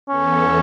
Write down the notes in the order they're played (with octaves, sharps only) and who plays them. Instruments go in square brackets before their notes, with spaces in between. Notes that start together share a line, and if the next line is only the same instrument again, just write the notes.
[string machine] E2 E3 B3 A4 [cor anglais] C#4